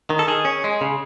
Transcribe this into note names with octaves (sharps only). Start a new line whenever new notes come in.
D#3
A4
D#3 G#4
C#4
G#3
C#3